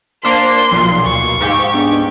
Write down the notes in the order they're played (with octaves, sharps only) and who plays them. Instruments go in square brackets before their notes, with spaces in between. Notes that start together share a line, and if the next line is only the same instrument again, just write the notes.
[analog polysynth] A#3 D4 B6 [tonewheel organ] C5 [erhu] C6
[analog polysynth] B1 A#2 [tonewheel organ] F3
[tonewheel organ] D2 [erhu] C#6
[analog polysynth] G#2 G4 [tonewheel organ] F5
[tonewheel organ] B3 D4